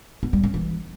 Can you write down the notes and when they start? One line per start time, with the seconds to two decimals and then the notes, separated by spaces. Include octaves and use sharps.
0.23 B3
0.33 G3
0.44 C#4
0.54 E3